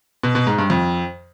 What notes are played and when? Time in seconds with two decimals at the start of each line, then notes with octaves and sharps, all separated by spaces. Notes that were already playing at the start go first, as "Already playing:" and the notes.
0.23 B2
0.35 B2
0.47 G#2
0.58 G2
0.70 F2